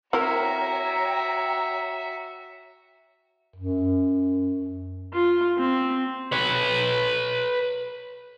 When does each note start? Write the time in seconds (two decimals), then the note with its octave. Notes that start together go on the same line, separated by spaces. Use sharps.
0.13 C4 E4 F#4 A#4 C#5 E5 G5 A#5
3.56 F#2
5.13 F4
5.58 C4
6.32 B4 C#5